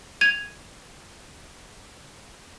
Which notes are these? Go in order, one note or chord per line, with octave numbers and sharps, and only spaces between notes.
G#6 D#7 F7